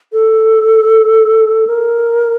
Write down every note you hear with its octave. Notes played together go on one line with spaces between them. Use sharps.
A4
A#4